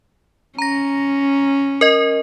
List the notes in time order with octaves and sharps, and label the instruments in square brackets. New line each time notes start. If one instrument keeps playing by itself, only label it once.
[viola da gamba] C#4 [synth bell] A#5 A#6
[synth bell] A#4 D#5